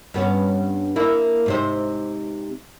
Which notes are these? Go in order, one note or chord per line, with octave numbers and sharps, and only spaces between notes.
G2 B3 C#4
A#3 D4 E4
G#2 C3 C5